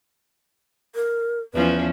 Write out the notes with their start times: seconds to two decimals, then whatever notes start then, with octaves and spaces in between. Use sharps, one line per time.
0.95 A#4
1.54 E2 F3 C#4 B4